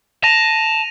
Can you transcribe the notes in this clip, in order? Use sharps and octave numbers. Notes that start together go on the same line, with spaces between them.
A5 A#6 D#7 F7